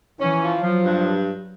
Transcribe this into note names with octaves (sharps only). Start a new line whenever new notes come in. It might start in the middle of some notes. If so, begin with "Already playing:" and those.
E3 C#4
F3
F3 F#3
G2